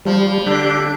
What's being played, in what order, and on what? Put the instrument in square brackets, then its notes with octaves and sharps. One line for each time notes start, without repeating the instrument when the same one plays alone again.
[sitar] F3 [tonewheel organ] G3
[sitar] D3 [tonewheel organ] D4 G4